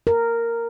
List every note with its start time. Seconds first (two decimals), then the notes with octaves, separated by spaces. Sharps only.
0.07 A#4